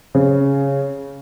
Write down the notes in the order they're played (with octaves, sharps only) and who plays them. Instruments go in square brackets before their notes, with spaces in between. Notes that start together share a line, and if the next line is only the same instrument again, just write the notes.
[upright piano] C#3